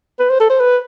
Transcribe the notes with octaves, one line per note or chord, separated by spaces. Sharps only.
B4
C5
A4
C5
B4